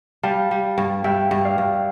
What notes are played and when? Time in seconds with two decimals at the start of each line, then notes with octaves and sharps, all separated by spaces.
0.23 G3 F5 A5
0.51 G3
0.78 G2
1.04 G2 E5 G5
1.31 G2
1.45 D5 F5
1.58 G2